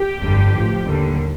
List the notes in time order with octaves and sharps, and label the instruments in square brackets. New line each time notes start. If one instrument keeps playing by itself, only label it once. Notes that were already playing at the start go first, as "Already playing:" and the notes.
Already playing: [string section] G4
G1 F2 D3 G3
A1 A2 F3
D#2 D3 G3